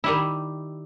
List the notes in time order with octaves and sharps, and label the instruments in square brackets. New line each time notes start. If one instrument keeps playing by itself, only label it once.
[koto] D#3 G3 E4